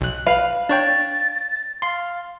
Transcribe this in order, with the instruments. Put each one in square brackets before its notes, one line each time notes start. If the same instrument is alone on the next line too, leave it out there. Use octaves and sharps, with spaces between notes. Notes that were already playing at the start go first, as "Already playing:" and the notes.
[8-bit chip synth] B1 F#6
[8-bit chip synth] B4 [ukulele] F5
[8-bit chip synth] D4 C#5 G5 [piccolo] A6
[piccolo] F5 [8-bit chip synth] C6